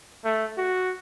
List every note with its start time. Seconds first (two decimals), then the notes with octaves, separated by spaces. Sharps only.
0.25 A3
0.57 F#4